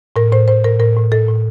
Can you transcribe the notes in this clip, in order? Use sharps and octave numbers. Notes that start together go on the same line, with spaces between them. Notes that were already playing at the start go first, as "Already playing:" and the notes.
A2 A#4
A2 C5
A2 C5
A2 A#4
A2 A#4
A2
A2 A4
A2